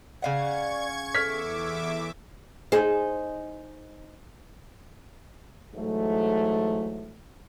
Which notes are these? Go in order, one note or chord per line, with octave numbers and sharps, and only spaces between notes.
C#3 D5 F5 F#5 C#6 G#6
E2 A4 E5 D6 F6 G#6 B6
D#4 G#4 C5
G#2 E3 F#3 A3